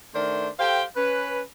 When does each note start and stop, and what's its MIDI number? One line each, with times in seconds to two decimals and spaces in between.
0.15 0.49 51
0.15 0.49 57
0.15 0.49 62
0.15 0.49 70
0.15 0.49 72
0.59 0.83 67
0.59 0.83 69
0.59 0.83 72
0.59 0.83 77
0.59 0.83 79
0.96 1.42 61
0.96 1.42 71